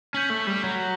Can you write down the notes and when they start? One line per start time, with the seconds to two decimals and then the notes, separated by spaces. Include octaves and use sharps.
0.14 C#4 G6 B6 F#7
0.30 A3
0.47 G3
0.63 F#3
0.80 F#7